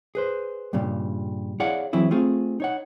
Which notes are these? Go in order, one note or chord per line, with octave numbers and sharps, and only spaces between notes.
G#4 B4 C5
G2 A#2 C#3 G3
E4 G#4 C#5 D5 F5 F#5
E3 F#3 C4 E4 G#4
A3 C4 F4 G#4
D#4 C#5 F#5